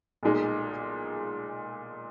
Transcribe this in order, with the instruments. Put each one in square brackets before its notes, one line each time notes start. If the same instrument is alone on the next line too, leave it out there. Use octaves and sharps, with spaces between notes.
[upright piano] B1 A#2 G#3 D#4